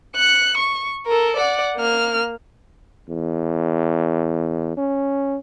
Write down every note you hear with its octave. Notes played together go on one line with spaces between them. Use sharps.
F#6 C#7
C#6
A4 A#4
D5 F#5
A#3 F6
E2
C#4